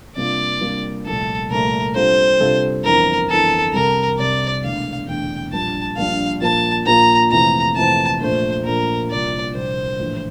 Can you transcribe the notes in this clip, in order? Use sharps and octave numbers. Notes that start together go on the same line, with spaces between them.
C3 G3 A#3 D4 F4 D5
C3 G3 A#3 D4 F4
C2 A#2 F3 A3 A4
C2 A#2 F3 A3 A#4
C3 G3 D4 F4 A4 C5
C3 G3 D4 F4 A4
G1 F2 E3 A#4
G1 F2 E3 A4
C2 C3 G3 A#4
C2 C3 G3 D5
E1 E2 D3 A3 D4 F5
E1 E2 D3 A3 D4 G5
A#1 A#2 G3 D4 A5
A#1 A#2 G3 D4 F5
A#2 F3 A#3 F4 A5
A#2 F3 A#3 F4 A#5
F2 C3 E3 A3 C4 A#5
F2 C3 E3 A3 C4 A5
A#1 A#2 A3 C5
A#1 A#2 A3 A#4
C2 A#2 F3 D5
C2 A#2 F3 C5
A#1 A2 E3